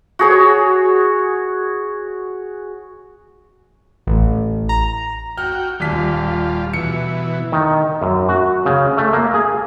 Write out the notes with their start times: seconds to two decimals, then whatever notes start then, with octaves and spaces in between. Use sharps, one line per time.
0.19 F#4 G#4 C#5
4.07 A1
4.69 A#5
5.38 F#4 G5 F6
5.80 D#1 G3 F4 B6
6.73 B2 E3 C#7
7.52 D#3
8.02 F#2
8.29 F#4
8.66 C#3
8.97 A3
9.13 A#3
9.34 G#4